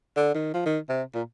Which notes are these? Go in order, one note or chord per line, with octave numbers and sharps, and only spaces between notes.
D3
D#3
F3
D#3
C3
A#2